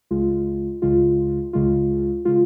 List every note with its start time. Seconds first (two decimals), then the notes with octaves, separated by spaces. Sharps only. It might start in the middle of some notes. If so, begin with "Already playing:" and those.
0.11 C#2 C#3 G#3 F4
0.82 C#2 C#3 G#3 F4
1.53 C#2 C#3 G#3 F4
2.25 C#3 G#3 F4